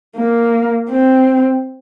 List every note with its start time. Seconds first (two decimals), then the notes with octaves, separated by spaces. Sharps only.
0.16 A#3
0.89 C4